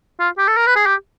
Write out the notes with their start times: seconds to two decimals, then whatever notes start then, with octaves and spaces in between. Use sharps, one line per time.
0.20 F4
0.38 G4
0.48 A4
0.57 A#4
0.66 B4
0.76 G#4
0.86 G4